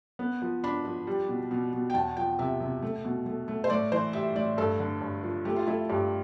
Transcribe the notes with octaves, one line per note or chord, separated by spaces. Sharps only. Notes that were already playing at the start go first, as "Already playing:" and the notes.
B3
F3
D4 B5
F3
G3
B2
B2
B2
G5
E2 A5
F3 G5
C3 E5
C3
A3
B2
A3
A3
C5
A2 D5
E3 C5
G3 E5
A2 D5
G2 A4
D3
G2
F3
A3 G4
F4
A3 E4
G2 G4